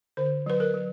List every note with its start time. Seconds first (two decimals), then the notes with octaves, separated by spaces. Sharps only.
0.17 D3 C5
0.46 F#3 B4
0.60 A#4
0.74 F#3